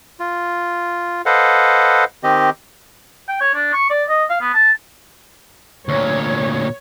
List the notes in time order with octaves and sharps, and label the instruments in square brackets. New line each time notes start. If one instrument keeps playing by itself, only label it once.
[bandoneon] F4
A4 B4 C5 D#5 F5 F#5
D#3 C4 G4 D#5
[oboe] G5
C#5
D4
C#6
D5
D#5
F5
B3
A5
[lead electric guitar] D2 A#2 [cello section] C#5